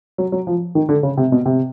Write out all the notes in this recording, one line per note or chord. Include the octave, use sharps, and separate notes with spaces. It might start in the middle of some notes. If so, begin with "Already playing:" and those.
F#3
F#3
F3
D#3
D3
C#3
C3
B2
C3